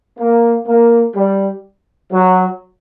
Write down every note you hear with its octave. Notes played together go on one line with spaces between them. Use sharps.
A#3
A#3
G3
F#3